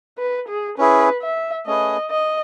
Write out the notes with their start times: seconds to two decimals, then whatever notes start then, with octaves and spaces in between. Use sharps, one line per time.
0.18 B4
0.48 G#4
0.78 C#4 E4 G#4 B4
1.21 E5
1.66 A3 C#4 G#4 B4 D#5
2.10 D#5